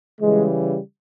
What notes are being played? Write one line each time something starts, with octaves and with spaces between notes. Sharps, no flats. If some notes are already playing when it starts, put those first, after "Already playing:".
C#3 E3 G3 G#3